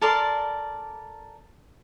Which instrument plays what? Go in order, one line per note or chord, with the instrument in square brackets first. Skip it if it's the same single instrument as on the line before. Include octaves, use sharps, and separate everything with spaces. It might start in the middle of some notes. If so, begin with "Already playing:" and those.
[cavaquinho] A4 A#4 D5 C6